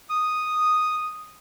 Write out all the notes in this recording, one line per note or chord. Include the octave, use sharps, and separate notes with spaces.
D#6